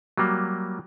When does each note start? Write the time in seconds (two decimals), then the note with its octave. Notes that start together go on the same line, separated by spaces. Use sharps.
0.17 F#3 G3 A#3